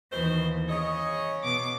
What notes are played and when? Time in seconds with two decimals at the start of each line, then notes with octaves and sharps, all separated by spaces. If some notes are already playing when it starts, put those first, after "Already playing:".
0.12 D#2 B2 D#3 E3 C5
0.69 C#3 G#4 C#5 D#5
1.44 B2 D6